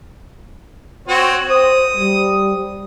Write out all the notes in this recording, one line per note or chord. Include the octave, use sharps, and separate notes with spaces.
C4 F#4 C#5
C5 D#6
G3